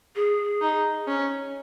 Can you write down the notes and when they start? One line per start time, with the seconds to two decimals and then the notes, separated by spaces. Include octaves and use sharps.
0.15 G#4
0.61 D#4
1.08 C#4